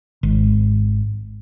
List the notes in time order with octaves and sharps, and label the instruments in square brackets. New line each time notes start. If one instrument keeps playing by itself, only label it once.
[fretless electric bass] G#1